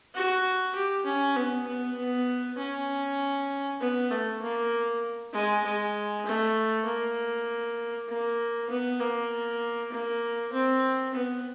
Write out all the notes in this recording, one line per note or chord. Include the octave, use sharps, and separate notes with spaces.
F#4
G4
C#4
B3
B3
B3
C#4
B3
A3
A#3
G#3
G#3
A3
A#3
A#3
B3
A#3
A#3
C4
B3